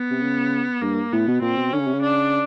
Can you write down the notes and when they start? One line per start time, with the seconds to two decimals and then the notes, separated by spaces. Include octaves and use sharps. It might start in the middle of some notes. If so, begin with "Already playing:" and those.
Already playing: B3
0.11 C3
0.22 C#3
0.81 G2 A#3
1.12 A2 B3
1.28 B2
1.42 A#2 C4
1.57 B2
1.73 D3 C#4
1.79 C#3
1.87 C3
1.94 C#3
2.02 D4